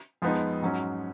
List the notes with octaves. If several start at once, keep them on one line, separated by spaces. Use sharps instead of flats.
F2 F3 G#3 B3 D#4
G#2 F#3 C#4